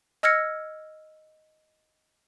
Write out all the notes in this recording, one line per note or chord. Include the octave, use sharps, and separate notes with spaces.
D#5 E6 F6 G#6 A#6 C#7